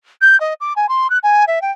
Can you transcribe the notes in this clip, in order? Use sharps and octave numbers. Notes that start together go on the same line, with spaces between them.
G6
D#5
D6
G#5
C6
F#6
G#5
E5
G5